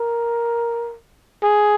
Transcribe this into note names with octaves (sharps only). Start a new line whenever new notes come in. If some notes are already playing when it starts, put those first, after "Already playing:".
Already playing: A#4
G#4